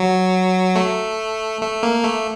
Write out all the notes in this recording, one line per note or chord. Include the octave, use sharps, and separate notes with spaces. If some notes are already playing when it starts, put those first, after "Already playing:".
Already playing: F#3
A3
A3
A#3
A3